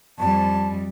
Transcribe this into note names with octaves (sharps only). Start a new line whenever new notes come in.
F2 G3 A5